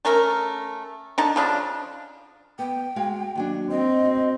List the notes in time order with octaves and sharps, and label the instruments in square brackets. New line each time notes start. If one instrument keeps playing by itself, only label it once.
[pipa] A3 C#4 A#4 E5
D3 D#4 A5
C#3 F3 D4
[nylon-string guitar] B3 [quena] G5
[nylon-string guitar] G#3 F#4 F5
D#2 F#3 D4
[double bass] C4 [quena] D#5
[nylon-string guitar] F#4